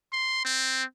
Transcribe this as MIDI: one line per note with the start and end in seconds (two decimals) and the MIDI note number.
0.13 0.44 84
0.45 0.83 60